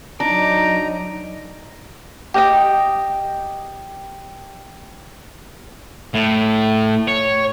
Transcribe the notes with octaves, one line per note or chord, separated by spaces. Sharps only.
F#3 D4 D#4 A#5 D6
G4 D#5 G5
A2
C#5